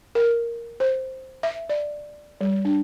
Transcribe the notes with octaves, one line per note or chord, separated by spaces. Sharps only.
A#4
C5
E5
D5
G3
D4